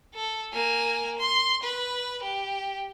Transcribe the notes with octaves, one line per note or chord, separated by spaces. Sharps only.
A4
A#3 G#5
C6
B4
G4